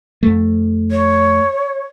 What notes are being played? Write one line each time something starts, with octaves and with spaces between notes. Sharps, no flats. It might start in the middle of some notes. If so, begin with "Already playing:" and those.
F2 A3
C#5